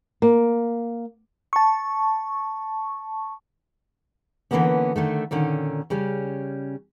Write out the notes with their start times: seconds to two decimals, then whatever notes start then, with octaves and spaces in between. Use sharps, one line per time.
0.22 A#3
1.53 A5 C#6
4.51 D3 E3 F#3 A#3 B3 C#4
4.96 D3 D#3 A3
5.31 A#2 D3 D#3 C#4
5.90 C#3 G3 C#4